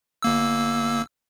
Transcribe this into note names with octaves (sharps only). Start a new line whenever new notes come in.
G1 A#3 E6